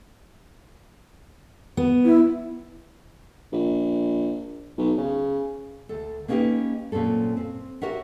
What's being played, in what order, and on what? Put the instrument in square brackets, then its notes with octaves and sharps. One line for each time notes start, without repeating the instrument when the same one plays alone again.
[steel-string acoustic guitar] B3
[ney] E4
[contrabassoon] A#1
B1
C#3
[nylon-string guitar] D2 A4
A#3 B3 C#4 D#4 G4 B4
F#2 A#2 C4 C#4 A4
C4
F#4 G4 A#4 C#5 E5 F#5